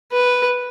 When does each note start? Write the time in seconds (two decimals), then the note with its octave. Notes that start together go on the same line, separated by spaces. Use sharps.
0.12 B4